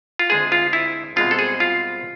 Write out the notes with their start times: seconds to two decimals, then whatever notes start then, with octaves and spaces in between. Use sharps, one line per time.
0.19 F4
0.30 D2 D3 G#3 C4 G#4
0.52 F4
0.73 E4
1.16 C2 B2 G#3 C4 F4
1.31 A4
1.39 G#4
1.60 F4